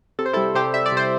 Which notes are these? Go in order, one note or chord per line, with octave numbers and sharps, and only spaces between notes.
C3 A4
C5
E4 A4
G3
C3 G4 C5
G3 E5
D5
C3 C5